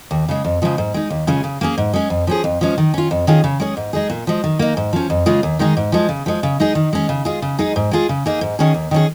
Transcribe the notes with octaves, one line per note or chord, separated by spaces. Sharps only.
D#2
C#3 G#3
F2
C#3 F3 G#3
G#2
G#3 D#4
D#2
C#3 G#3 C#4 F4
C#3
A#3 C#4 G#4
G#2
G#3 C#4
F2
F3 C#4 G#4
F2
F3 G#3 C#4
D#3
C#4 F4
F2
D#3 C#4 F4 G#4
C#3
G#3 C#4 G#4
G#2
G#3 D#4 G#4
A#2
F3 G#3
D#3
A#3 D#4
G#2
F3 C#4
F2
C#3 G#3 F4 G#4
D#2
D#3 G#3 D#4 G#4
G#2
F3 G#3
C#3
F3 G#3
C#3
G#3 D#4 G#4
D#3
G#3 C#4
C#3
G#3 F4 G#4
C#3
G#3 D#4 G#4
G#2
G#3 F4 G#4
C#3
A#3 D#4 G#4
G#2
D#3 C#4 G#4
D#2
D#3 C#4 G#4